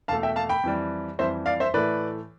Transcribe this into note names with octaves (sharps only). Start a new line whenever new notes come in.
E2 B2 A3 F5 A5
E5 G5
F5 A5
G5 B5
F2 E3 G3
F2 E3 G3 C5 E5
D5 F5
C5 E5
A2 E3 A3 B4 D5